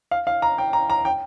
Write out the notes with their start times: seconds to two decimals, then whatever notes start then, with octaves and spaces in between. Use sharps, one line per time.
0.11 F5
0.27 F5
0.42 A#5
0.58 G5
0.73 A#5
0.90 A#5
1.05 G5